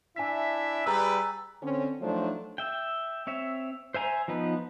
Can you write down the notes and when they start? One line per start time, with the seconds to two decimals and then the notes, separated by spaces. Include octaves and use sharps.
0.16 D4 E4 E5 G#5 B6
0.86 G3 G#4 B4 A#5 E6
1.62 D3 C4 C#4
2.01 F3 F#3 A3 D4 D#4 C5
2.58 E5 G5
3.27 C4 C#5 E5
3.94 C5 E5 G#5 A#5
4.28 F3 B3 D#4 B4